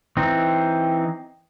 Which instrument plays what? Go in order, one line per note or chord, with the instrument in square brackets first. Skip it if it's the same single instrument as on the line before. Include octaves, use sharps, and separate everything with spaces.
[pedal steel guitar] E3 C4 D#4